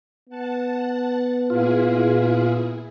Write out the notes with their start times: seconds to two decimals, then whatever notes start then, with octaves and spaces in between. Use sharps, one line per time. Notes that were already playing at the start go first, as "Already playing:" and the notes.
0.29 B3 F#5 A5
1.50 A#2 E4 F4 G#4